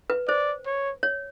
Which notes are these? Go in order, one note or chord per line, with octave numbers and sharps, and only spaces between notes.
B4
C5 D5
C#5
C#5